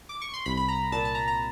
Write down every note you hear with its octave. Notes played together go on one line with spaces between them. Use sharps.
D6
C#6
C6
C2 B5
B5
A#5
A#2 A5
A5
A#5
A#5